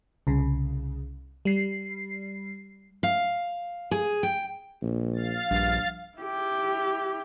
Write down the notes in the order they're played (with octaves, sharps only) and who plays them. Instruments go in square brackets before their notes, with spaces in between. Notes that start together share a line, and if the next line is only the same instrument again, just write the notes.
[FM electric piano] C2 C#3
G3 C7
[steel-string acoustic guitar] F5
G#4
G5
[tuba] A#1
[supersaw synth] F5 A6
[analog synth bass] A#1 [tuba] G2
[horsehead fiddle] E4 G4